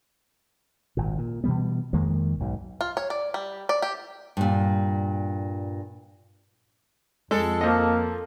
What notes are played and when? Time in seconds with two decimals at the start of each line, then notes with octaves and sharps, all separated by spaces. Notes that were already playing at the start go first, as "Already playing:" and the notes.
0.97 G#1 A#2
1.18 A#2
1.44 B2 E3 G3 B3
1.93 F2 D#3 G#3 A#3
2.40 B1 G#2 B2
2.81 F4
2.97 C#5
3.10 D5
3.34 G3
3.69 D5
3.82 G4
4.37 G2 A#2
7.31 F2 G#3 A4
7.61 F3 A#3 D#5